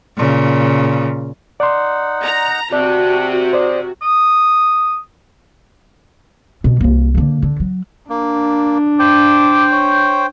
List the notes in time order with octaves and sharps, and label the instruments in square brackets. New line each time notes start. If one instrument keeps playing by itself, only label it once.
[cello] A#2 C#3
[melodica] D#4 F#5 [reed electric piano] D5 C6
[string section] A#5
[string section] C3 [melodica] D4 [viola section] F#4 [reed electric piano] D5
[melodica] G#4 [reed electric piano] C5 D5
[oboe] D#6
[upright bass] B2 C#4
C2 A#3
D3 A#3
D3
F#3
[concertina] A#3 [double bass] D4
[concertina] C5 G5 [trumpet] D6
[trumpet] C#5